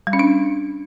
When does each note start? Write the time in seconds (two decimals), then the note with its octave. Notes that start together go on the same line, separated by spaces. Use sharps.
0.07 G3
0.13 C#4
0.19 D4